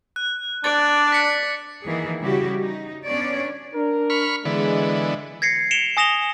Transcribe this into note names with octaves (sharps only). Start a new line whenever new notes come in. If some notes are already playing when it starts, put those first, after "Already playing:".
F#6
D4 D5 A6
B6 C#7
D#3 E3 A#3 G#4
C#3 G3 E4 F#4 G4
D#4
B3 C#4 D4 C#5 D5
D4 A#4
B5 C#6 F6
D3 E3 G#3 B3
G#6 A#6 C7 C#7
C#7 D7 E7 F7 G7
G#5 D#6 A#6 E7 F7 G7